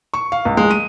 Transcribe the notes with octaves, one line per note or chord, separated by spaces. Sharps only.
C#6
F5
C#2
G#3
D#7